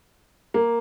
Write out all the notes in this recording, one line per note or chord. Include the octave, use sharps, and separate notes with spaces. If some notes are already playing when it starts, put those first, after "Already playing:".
A#3